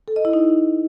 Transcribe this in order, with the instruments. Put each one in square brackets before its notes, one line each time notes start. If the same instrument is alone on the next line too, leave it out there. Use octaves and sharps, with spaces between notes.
[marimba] A4
D#5
E4
D#4